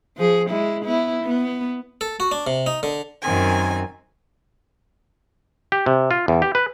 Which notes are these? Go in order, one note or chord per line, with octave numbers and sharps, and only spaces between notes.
F3 G#4
G#3 E4
B3 E4
B3
A4
F#4
D4
C3
D#4
D3
F#2 D#3 C4 G#5
G4
C3
F4
E2
G4
B4